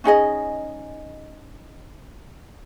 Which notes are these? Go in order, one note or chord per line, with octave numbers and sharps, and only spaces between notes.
C#4 D#4 G#4 D#5